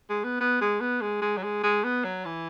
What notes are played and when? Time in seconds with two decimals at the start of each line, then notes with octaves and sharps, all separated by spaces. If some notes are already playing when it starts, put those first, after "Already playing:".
0.09 G#3
0.24 B3
0.40 B3
0.61 G#3
0.80 B3
1.01 G#3
1.21 G#3
1.37 F#3
1.43 G#3
1.63 G#3
1.84 B3
2.04 F#3
2.25 E3